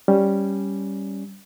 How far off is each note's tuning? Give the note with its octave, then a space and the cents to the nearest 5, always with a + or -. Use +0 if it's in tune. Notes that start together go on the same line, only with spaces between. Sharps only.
G3 +0 C#4 +0